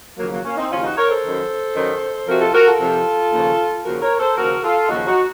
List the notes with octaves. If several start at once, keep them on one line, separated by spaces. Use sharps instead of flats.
D#2 C#3 F3 F#3 A#3
F#3 A#3
A#3 C#4
C4 D#4
D#2 C#3 F3 C#4 F4
D#4 F#4
A#4 C#5
A4 C5
F#2 D#3
F#2 D#3
F2 C3 F3 F#4 A#4
F4 A4
F#4 A#4
F4 A4
F2 C3 F3
D#2 C#3 F3
D#2 C#3 F3 F#4 A#4
A#4 C#5
A4 C5
D#2 C#3 F3 F#4 A#4
F4 A4
D#2 C#3 F3 D#4 F#4
D#4 F#4